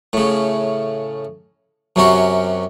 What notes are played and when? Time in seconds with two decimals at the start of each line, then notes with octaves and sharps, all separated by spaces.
0.13 A2 C#3
1.96 F#2 C3 C#4 F#4